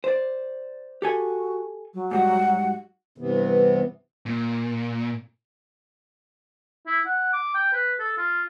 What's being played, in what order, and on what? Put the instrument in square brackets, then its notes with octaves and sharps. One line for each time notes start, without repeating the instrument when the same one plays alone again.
[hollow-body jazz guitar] C5 D5
[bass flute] F#4 [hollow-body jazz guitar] G4 A4 G#5
[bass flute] F#3
[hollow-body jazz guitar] G#2 G3 F#4 [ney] F#5
[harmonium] G2 C3 E3 B3
[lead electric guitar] A#2
[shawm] E4
F#5
D6
G5
B4
A4
F4